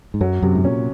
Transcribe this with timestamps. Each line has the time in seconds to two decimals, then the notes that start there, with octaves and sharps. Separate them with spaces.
0.14 G#2
0.21 F#2 F#3
0.42 F#2 C3
0.55 G#2
0.64 A#2 C#4